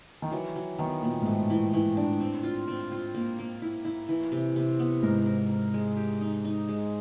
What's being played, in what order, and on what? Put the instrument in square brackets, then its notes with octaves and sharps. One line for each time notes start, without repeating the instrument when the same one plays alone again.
[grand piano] D#3
[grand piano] E3 [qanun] F#3
[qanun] F#3
[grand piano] D#3 [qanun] B3
[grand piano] A#2 [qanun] B3
[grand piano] G#2
[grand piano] A2 [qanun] A3
[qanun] E3
E3
D4
C4
F4
C4
F4
A#3
A#3
E4
E4
E3
C3
C3
B3
[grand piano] G#2 [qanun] A#4
[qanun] A#4
A#4
G#3
G4
D#4
D#4
G#3